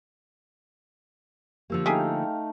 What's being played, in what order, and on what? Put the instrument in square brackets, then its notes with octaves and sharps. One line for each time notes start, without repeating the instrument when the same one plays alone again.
[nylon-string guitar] D3 F3 A#3 [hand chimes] G4 E6
[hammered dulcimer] A3 D#4 [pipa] G4 G#4 [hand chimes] F5 G5 F6